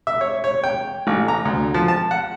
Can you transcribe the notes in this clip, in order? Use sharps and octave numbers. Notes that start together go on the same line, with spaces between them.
E5
C#5
C#5
G5
A1
A#5
D2
F3
A5
F#5